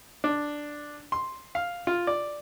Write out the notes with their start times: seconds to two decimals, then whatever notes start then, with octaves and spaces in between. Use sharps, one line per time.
0.24 D4
1.12 C6
1.55 F5
1.87 F4
2.07 D5